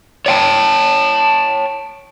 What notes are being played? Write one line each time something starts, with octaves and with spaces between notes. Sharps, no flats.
C#5 D5 F#5 G5 A5